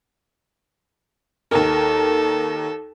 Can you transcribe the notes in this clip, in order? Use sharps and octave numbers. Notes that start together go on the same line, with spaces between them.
D#2 A4 A#4